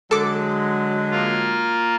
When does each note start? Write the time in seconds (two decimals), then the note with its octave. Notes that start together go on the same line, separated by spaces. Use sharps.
0.11 D3 F#3 G#3 A4 D6
1.11 A#3 F4